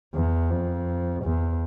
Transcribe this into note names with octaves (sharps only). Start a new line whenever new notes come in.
E2
F2
E2